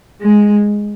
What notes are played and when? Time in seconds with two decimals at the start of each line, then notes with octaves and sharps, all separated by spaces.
0.20 G#3